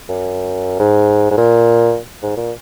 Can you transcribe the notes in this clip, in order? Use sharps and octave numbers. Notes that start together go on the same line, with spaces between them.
F#2
G#2
G#2
A#2
G#2
A#2